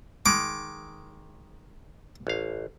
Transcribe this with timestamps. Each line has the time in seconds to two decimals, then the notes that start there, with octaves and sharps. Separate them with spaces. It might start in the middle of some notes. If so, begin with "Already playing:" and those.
0.26 D#3 G#3 D6
2.27 A1 F5